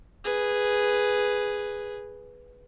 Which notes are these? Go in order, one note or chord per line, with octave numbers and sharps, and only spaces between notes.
G#4 B4